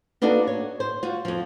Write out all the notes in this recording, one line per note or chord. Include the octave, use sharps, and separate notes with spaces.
A#3 B3 D4 D#4 F#4 A4
C#5
C5
F4 F#4
F2 F3